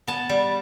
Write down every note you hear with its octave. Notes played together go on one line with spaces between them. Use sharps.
B3 A5
G3